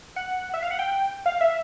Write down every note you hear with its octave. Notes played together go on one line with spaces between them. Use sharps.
F#5
E5
F5
F#5
G5
F5
E5